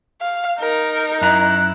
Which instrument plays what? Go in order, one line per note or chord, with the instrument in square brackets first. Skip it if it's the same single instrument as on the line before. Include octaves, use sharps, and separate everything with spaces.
[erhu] F5
[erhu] D#4 [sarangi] A#4
[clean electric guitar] F#2 A#5 [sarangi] E4 [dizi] F#6